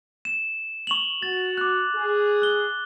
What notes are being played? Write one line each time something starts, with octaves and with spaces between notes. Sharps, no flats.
E7
C#6 F7 F#7
F#4 A6
D6 F#6
G#4
F#6 G7